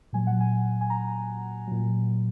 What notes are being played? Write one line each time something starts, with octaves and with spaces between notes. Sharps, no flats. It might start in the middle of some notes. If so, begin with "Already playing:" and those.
A#2 F#3 G#5
F#5
G#5
G#5
A#5
A#2 F#3